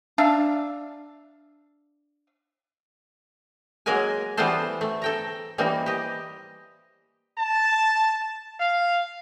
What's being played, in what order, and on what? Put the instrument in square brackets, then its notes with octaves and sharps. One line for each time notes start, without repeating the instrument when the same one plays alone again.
[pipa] D4 E5 F5
[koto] F#3 G#3 A#3 A#4 G#5
E3 G3 B3 F4 A4 C5
A3
A4 G5 A#5
E3 G3 A#3 C4 D#4
G4 D#5
[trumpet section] A5
F5